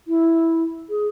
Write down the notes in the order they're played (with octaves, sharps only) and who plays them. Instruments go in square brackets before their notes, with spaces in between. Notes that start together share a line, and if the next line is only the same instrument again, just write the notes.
[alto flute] E4
G#4